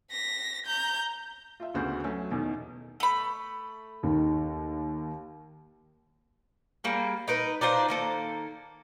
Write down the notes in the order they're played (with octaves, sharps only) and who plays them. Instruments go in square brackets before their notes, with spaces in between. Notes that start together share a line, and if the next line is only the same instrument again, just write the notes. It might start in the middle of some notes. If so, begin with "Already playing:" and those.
[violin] A#6 B6
A#5 G6
[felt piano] F4 E5
D2 C#3 B3 F#4 C5
F#3 A3 C#4 A4
E2 B2 D#3
[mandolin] A3 B5
[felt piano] D#2 D#3
[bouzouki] G3 A#3 G#4
D#4 A#4 B4
D4 D#4 F4 C5
D#3 A#3 A4